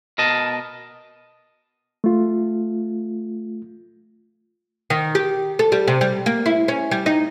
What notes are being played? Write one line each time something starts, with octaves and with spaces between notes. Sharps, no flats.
B2 A#4 D#5 A5
A3 F4
D#3
G4
A4
G3
C3
G3
A#3
E4
C#4
G3
D#4